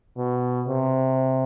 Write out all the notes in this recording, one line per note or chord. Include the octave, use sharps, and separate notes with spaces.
B2
C3